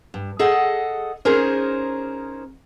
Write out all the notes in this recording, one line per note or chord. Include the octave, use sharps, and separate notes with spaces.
G2
G#4 A4 D#5 F#5
C#4 D#4 G#4 A#4 C5